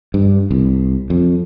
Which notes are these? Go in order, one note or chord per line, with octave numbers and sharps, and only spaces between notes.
G2
C2
F2